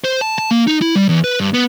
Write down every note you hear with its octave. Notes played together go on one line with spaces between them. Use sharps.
C5
A5
A5
A#3
D#4
E4
G3
E2
B4
G2
B3